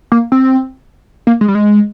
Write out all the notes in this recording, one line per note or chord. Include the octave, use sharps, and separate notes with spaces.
A#3
C4
A#3
G#3
G3
G#3